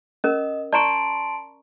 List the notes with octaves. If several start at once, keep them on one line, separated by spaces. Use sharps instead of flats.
C#4 A#4 D#5
D5 A5 A#5 C6 C#6 D7